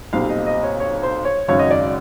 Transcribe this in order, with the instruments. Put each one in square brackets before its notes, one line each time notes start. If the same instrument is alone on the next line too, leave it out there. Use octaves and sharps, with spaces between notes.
[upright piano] B1 A#2 G3 C4 F5
D#5
D#5
C#5
C#5
C5
C#5
G#1 F#2 C#3 C#5
D#5
D5